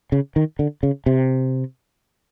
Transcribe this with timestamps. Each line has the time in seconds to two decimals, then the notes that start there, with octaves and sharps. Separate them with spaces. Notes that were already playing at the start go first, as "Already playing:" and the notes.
0.12 C#3
0.36 D#3
0.59 D3
0.83 C#3
1.06 C3